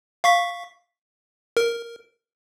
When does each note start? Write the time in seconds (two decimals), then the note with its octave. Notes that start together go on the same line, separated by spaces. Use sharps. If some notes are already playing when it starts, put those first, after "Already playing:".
0.24 F5 C#6 B6
1.57 A#4